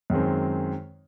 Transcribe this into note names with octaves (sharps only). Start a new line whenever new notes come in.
F#2 D#3 G#3 C4